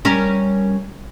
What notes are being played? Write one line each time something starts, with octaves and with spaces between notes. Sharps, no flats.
G3 C#4 A#4